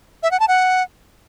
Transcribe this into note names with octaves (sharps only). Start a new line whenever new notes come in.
E5
F#5
A5
F#5